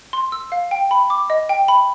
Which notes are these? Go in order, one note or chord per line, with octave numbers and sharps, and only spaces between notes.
C6
E6
F5
G5
B5
D6
D#5
G5
B5